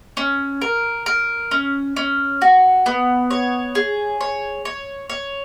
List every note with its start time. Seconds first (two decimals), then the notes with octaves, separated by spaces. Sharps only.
0.17 C#4
0.61 A#4
1.06 A#4
1.51 C#4
1.96 C#4
2.42 F#4
2.86 B3
3.31 C#5
3.75 G#4
4.21 C#5
4.65 C#5
5.10 C#5